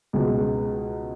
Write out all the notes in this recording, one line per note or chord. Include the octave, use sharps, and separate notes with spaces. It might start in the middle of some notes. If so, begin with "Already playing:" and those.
C#2 B2 G#3